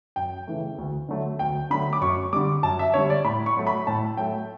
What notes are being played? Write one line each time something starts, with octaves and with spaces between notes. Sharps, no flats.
F#2 G5
C#3 E3 A3
D2
D3 F#3 A3
D2 G5
D3 F#3 A3 B5
D6
F#2 C#6
D3 G3 D6
F#2 A5
E5
D3 G3 C#5
D5
A2 B5
C#6
F#3 A3
B5
A2 A5
F#3 A3 G5